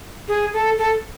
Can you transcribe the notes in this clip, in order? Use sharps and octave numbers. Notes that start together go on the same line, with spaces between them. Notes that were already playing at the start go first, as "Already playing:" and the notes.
G#4
A4
A4